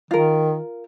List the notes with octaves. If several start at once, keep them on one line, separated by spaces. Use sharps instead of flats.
D#3 F4 A#4